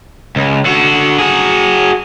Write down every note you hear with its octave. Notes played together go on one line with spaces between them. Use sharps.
C#2
D3 F#4
F#4 G#4